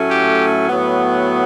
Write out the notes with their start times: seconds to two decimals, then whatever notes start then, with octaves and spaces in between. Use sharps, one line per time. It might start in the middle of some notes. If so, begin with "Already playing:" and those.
Already playing: A2 F#3 A3 C#4
0.09 G4
0.69 A2 F#3 B3